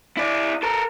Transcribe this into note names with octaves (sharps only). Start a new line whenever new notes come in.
E4 D5
A4 A#4